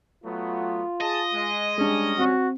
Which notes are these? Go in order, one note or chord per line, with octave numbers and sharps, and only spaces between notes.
F#3 A3 B3 F4
G#4 D#5 A5
G#3
G3 G#3 C#4 D4
C4 F#4